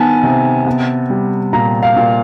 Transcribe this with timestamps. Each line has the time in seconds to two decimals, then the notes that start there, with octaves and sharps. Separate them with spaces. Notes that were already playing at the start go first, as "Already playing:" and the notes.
Already playing: D#3 B3 G#5 A5
0.23 C3
0.66 B3
1.10 G3
1.53 A#2 A#5
1.83 F5
1.96 A#2